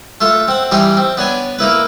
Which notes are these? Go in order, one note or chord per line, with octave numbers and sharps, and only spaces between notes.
A3 F4 A4
C4 F#5
E3 G3 D#4 G5 C6
C4
B3 D4 C#5 G#5
A#3 D#4 E4 B4